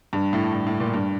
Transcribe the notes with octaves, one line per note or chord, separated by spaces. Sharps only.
G2
A2
G2
A2
A#2
G2